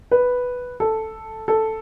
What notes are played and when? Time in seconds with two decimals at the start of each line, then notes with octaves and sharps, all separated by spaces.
0.11 B4
0.80 A4
1.48 A4